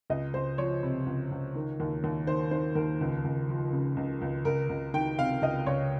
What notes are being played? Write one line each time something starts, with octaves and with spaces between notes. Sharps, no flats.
C#2 D#5
C#2 C5
F3 C#5
C3
C#2
C#2
D#3
D#2
D#2
D#3 C5
D#3 C5
D#2 A#4
C#2
C#2
F3
C#3
C#2
C#2
C#2 A#4
C#2
D#3 G5
C3 F5
C#2 D#5
C#2 C#5